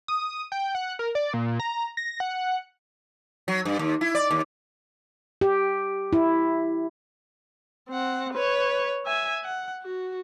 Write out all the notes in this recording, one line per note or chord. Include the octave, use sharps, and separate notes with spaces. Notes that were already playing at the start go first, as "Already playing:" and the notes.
D#6
G5
F#5
A#4
D5
A#2
A#5
A#6
F#5
F#3
G2
D#2
E4
D5
D#2
G4
E4
C4 F#5
B4 C#5
E5 G#5
F#5
F#4